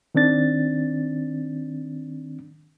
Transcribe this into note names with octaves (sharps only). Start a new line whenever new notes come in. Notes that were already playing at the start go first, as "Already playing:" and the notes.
D#3 C4 D4 A6